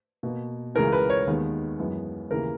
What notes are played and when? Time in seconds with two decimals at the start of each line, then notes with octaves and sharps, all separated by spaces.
0.23 B2 A#3
0.75 C#2 C#3 E3 A#4
0.92 B4
1.10 C#5
1.27 D#2 D#3 G#3 B3
1.78 F#2 E3 G#3 B3
2.31 D#2 C#3 E3 A#3 A#4